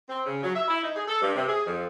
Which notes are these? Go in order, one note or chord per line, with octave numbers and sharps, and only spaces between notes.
C4
C#3
F#3
E5
E4
D#4
G#4
A4
G2
C3
G#4
F2